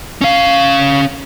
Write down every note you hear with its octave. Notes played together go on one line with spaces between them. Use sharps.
C#4 F5